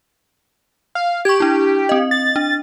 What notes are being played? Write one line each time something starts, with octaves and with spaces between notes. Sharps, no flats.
F5
G4 C#6 G#6
D4 E4
C4 D#5
A6
D4